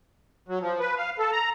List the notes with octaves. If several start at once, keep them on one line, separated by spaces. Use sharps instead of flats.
F#3
F3
B4
F5
A4
A#5